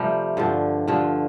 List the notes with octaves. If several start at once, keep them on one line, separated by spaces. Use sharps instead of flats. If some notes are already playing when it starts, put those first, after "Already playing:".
Already playing: C3 F3 G3 A3
G2 D3 F3
G2 D3 F3